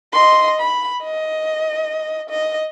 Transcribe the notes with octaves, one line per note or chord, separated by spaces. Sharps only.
D#5 C6
B5
D#5
D#5